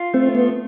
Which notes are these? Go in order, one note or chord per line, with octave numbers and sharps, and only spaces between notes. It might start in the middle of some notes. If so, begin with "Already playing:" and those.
Already playing: F4
A3 C4
B3